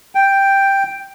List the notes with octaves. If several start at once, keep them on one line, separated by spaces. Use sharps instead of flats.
G5